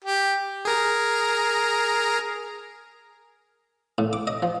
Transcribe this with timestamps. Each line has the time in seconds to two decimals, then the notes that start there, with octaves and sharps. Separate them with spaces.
0.04 G4
0.65 G#4 A#4 A#5
3.98 A2
4.13 D6
4.27 D#5
4.43 F3